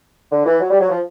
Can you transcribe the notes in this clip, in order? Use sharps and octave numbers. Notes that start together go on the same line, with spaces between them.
D3
E3
F#3
G3
F#3
F3